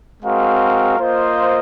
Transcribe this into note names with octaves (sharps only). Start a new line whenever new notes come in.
G#3 C4 F#4 A#4 F5
A#3 F4 C5 D#5